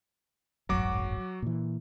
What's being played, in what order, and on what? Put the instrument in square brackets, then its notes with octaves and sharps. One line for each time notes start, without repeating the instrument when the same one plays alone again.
[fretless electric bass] D1 G#1 F#2 [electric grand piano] F#3 F#4 D6
[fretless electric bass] A#2 E3